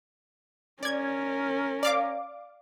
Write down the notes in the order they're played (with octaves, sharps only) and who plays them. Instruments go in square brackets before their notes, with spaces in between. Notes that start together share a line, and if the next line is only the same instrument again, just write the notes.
[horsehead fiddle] C#4 A#4 [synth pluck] D5 G#6
[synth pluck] D5 F5 D6